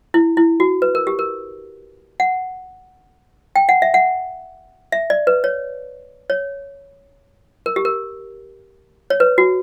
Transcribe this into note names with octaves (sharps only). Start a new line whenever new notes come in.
E4
E4
F#4
B4
A#4
G4
A#4
F#5
G5
F#5
E5
F#5
E5
D5
B4
C#5
C#5
A#4
G4
A#4
C#5
B4
F#4